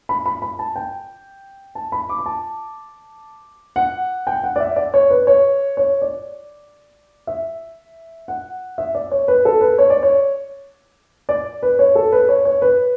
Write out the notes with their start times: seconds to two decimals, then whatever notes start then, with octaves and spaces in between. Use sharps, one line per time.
0.09 B5
0.26 B5
0.42 B5
0.59 A5
0.76 G5
1.75 A5
1.92 B5
2.09 D6
2.18 B5
2.26 A5
3.76 F#5
4.27 G5
4.44 F#5
4.56 D5
4.60 E5
4.76 D5
4.94 C#5
5.10 B4
5.27 C#5
5.77 C#5
6.02 D5
7.27 E5
8.28 F#5
8.78 E5
8.95 D5
9.11 C#5
9.28 B4
9.45 A4
9.61 B4
9.78 C#5
9.90 D5
10.03 C#5
11.29 D5
11.63 B4
11.79 C#5
11.95 A4
12.12 B4
12.29 C#5
12.45 C#5
12.62 B4